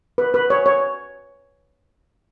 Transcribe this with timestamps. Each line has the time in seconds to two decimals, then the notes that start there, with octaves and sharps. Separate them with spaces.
0.18 B4
0.34 B4
0.50 C#5
0.66 C#5